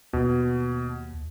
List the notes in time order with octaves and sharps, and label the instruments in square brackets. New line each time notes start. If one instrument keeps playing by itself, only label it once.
[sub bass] D#2 [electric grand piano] B2